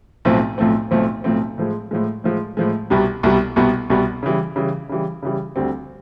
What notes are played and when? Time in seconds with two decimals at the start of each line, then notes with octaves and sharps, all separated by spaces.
0.25 B1 A2 F3 A3 C4
0.58 B1 A2 F3 A3 C4
0.91 B1 A2 F3 A3 C4
1.24 B1 A2 F3 A3 C4
1.58 A2 F3 G#3
1.91 A2 F3 G#3
2.24 A2 F3 G#3
2.57 A2 F3 G#3
2.90 C2 B2 G3 B3
3.23 C2 B2 G3 B3
3.56 C2 B2 G3 B3
3.90 C2 B2 G3 B3
4.23 C#3 E3 G3
4.56 C#3 E3 G3
4.89 C#3 E3 G3
5.23 C#3 E3 G3
5.56 D2 D3 G3 C4